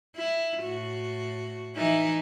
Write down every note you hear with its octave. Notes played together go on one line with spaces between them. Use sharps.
E4
A2 F#4
E3 D#4 E4